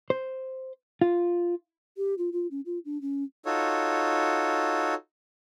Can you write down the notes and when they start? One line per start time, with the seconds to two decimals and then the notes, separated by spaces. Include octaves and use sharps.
0.10 C5
1.01 F4
1.97 G4
2.18 F4
2.32 F4
2.51 C#4
2.66 F4
2.85 D4
3.02 C#4
3.46 D#4 F4 F#4 A4 C#5